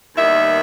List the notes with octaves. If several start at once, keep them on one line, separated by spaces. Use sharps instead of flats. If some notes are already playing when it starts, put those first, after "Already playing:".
D#2 D#3 G3 B3 E5